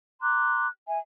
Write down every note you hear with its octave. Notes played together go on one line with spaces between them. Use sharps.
A#5 C6 D6 F#6
E5 G#5